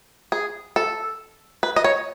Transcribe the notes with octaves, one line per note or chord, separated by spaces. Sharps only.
G#4
A4
B4
D#5
C#5